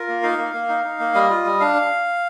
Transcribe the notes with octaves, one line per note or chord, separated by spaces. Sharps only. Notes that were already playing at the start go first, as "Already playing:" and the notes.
Already playing: F4 A#4
A#3
D#4 F5
A#3
A#3
D#4
D#4
A#3
G3 D#5
F4
G3
D4 F5